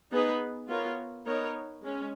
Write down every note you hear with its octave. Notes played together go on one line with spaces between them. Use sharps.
B3 D#4 G#4 B4
B3 F4 A#4 C#5
B3 D#4 A#4 C#5
G#3 C#4